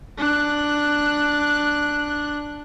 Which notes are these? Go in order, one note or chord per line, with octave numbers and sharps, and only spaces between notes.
D4 F#6